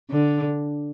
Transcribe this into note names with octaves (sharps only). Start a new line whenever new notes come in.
D3